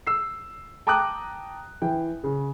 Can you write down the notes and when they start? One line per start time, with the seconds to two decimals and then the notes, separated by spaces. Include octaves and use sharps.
0.07 E6 C7
0.87 G5 A5 A#5 D6 D#6 F#6
1.82 E3 G5
2.24 C#3